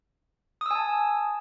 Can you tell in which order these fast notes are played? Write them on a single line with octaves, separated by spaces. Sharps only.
D#6 E6 G#5 A5